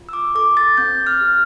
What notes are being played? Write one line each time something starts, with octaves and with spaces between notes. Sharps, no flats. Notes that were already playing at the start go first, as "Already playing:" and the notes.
Already playing: F4
E6
D6
A4 D6
A6
C4 G6
F6
G4